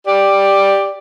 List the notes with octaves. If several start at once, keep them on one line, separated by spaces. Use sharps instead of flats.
G4 D5